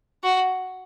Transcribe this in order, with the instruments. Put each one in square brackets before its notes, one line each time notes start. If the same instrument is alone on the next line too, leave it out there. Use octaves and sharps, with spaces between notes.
[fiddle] F#4